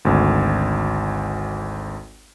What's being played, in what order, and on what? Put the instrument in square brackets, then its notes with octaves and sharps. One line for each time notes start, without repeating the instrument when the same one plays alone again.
[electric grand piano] G#1 D2